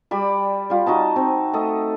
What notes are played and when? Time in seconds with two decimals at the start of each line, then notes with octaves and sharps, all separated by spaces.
0.11 G3 D5 B5
0.70 G3 F4
0.86 D#4 F#4 D#5 A5
1.16 C4 D#4
1.53 A3 A4 D#5